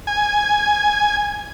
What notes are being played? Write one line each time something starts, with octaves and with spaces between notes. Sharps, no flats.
G#5